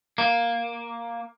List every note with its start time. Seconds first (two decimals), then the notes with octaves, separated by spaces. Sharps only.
0.18 A#3